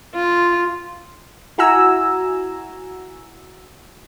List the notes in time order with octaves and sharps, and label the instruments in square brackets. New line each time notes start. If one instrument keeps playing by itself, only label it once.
[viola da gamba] F4
[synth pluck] E4 F#4 G#5 A#5 E6